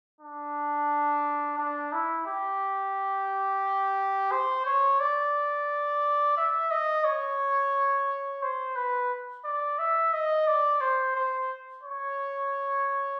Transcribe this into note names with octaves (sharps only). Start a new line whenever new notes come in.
D4
D4
E4
G4
C5
C#5
D5
E5
D#5
C#5
C5
B4
D5
E5
D#5
D5
C5
C5
C#5